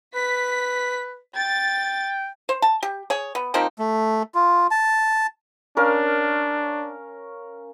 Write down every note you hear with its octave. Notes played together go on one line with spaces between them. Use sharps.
B4 B6
G5 A6
C5
A5
G4
G#4 C#5
B3
F3 A#3 C4 D#4
A3
F4
A5
C#4 D4 A#4 F5